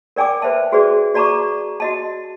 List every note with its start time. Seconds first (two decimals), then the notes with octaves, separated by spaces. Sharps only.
0.16 A#4 D5 G5 G#5 D6
0.42 B4 C5 E5 A5
0.72 F#4 G#4 B4 C5 D5
1.14 F#4 D5 A5 A#5 C#6 D6
1.80 F#4 D#5 A5